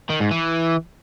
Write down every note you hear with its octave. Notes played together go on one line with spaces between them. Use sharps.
D#3
G#2
E3